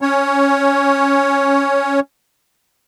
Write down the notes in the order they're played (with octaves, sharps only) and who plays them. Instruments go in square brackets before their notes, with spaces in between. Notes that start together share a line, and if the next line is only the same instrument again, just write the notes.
[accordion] C#4 C#5